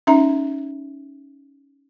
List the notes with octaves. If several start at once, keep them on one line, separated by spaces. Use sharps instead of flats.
C#4 D#4 E5 A#5